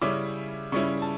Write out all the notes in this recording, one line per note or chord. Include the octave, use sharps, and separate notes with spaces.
C#3 G3 C#4 E4 D6
C#3 G3 C#4 E4 C#6
A5